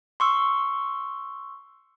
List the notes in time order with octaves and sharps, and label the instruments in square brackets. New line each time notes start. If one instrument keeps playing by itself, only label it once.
[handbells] C6 C#6 E6